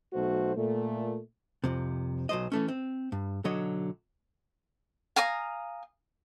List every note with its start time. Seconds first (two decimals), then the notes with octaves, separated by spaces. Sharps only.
0.12 B1 A3 F#4 C5
0.55 A#2 A3
1.64 C2 F2 C3
2.29 B1 F#3 C5 D#5
2.52 E3 A3 C#4
2.68 C4
3.12 G2
3.45 B1 D3 F#3 C#5 D#5
5.16 F5 G#5 A#5 D#6